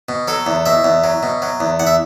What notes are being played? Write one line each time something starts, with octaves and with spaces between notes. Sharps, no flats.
B2
F#3 A4
E2
B2 E5
E2
F#3
B2
F#3
E2
E2 F#5
E5